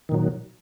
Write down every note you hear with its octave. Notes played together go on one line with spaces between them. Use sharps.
A#2 D#3 F#3